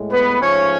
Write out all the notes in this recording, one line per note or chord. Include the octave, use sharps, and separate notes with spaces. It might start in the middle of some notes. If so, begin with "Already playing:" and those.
Already playing: A2 G#3
B3 B4
G#2 F3 A3 C#4 C#5